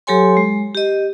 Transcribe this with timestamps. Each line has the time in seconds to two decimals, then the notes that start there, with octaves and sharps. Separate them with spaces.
0.07 F#3 G4 A4 C#5 G#5 C6
0.37 G#3
0.75 G4 D#5